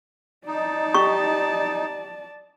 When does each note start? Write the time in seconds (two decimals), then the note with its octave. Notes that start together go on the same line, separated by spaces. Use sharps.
0.46 D#4 D5 A5
0.94 G4 C#6